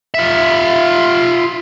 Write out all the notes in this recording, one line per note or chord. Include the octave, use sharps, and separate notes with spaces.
F4 E5